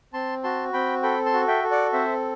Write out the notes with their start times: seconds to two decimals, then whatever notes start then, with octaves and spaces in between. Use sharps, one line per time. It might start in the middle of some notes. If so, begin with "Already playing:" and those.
0.13 C4 A5 C6
0.43 F#4 A5 C6
0.73 C4 G5 B5
1.03 A4 G5 B5
1.26 A5 C6
1.33 F#4
1.48 E5 G5
1.64 A4
1.71 D5 F#5
1.93 C4 C5 E5